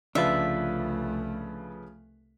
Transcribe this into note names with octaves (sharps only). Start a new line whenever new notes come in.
C2 C#3 F3 A3 D4 F4 B4 E5